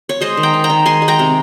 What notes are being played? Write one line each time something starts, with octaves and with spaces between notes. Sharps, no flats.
C#5
G#3 C5 D#5
D#3
G5 A#5
D#4
G5 A#5
D#3
G#3 G#5 C6
G#3
G5 A#5
C3